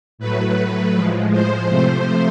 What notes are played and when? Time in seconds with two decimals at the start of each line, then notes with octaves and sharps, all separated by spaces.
0.18 A2 F#3 A3 B4
0.94 A2 F3 G#3
1.32 C5
1.69 C3 F3 A3